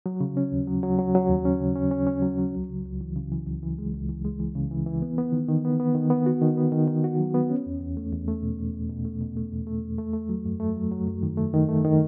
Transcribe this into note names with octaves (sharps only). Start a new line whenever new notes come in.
F#3
C#3
C#4
D#2
F#3
F#3
F#3
F#3
D#2
C#4
C#3
C#4
C#4
C#4
F#3
F#3
C#2
C#3
C#2
E3
C#3
E3
C#2
E3
G#3
C#2
E3
G#3
E3
C#3
E3
E3
B3
B3
D#3
D#3
B3
B3
D#3
B3
F#4
D#3
B3
D#3
D#3
F#4
F#3
B3
C#4
E2
E2
A3
E2
A3
B2
E2
E2
B2
A3
B2
A3
E2
A3
E2
A3
A3
F#3
F#2
A3
F#3
F#3
F#2
D#3
A3
D#3
A3
D#3